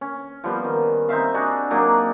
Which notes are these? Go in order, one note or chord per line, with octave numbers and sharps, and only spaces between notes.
C#4
F3 G3 B3
D#3
C4 D#4 E5 F5
D4 D#4 F#4 G#4
F#3 A#3 D4 D#4